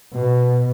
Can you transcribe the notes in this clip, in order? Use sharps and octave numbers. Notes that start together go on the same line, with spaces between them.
B2